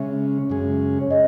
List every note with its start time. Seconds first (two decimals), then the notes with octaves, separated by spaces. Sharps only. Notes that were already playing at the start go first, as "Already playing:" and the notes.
Already playing: C#3 G#3 C#4 E5
0.50 F#2 C#3 G#3 C#4 G#4
1.01 C#5
1.10 C#4 G#4 D#5